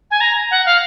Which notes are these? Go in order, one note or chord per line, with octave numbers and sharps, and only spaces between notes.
G#5
A#5
F#5
F5